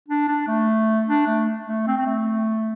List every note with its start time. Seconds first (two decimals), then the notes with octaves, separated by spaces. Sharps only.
0.08 D4
0.28 D4
0.48 A3
1.07 D4
1.27 A3
1.67 A3
1.87 C4
1.98 C4
2.07 A3